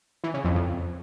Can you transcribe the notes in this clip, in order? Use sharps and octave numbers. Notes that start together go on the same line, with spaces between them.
E3
C#3
F2
F2